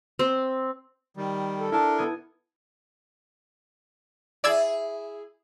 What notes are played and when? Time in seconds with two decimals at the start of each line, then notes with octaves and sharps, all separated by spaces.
0.19 C4
1.17 D#3 G3
1.59 A4
1.72 D4 E4 A#4 A5
1.98 B3 D#6 G#6
4.44 E4 G#4 D5 E6 G#6